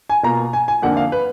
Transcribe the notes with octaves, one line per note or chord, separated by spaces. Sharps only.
G#5
B2 A#3 F4 A#5
G#5
G#5
F2 D3 F3 A#3 D4 F#5
F5
B4